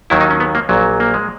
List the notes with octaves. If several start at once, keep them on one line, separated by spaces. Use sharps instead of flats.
D#2 D#3 F#3 E4
D#4
C#4
B3
A#3
A#1 A#2 F#3
A#3
G#3